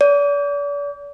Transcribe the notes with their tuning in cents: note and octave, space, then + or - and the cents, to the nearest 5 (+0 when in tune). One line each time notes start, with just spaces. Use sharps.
D5 -40